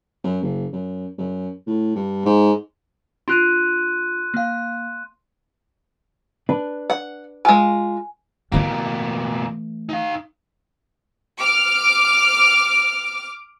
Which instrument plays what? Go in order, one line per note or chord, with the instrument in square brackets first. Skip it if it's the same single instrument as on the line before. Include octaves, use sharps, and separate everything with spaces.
[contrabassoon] F#2
F#1
F#2
F#2
A2
G2
G#2
[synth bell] D4 F4 [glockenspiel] C6 F#6 D#7
[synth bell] A#3 F5
[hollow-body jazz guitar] D4 B4
[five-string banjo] F#5
[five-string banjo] G#3 F4 [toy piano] G#5
[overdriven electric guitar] B2 A#3 [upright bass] E3 A3
[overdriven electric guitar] D#4 F5
[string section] D6 F6